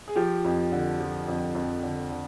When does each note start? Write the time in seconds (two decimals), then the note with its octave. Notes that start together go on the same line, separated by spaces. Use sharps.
0.08 G#4
0.16 F3 G4
0.44 F2
0.72 D3
1.00 F3
1.28 F2
1.55 F2
1.83 D3
2.10 D3